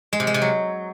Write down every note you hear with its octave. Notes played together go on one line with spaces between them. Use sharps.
G#3
C3
G#3
C3
F#3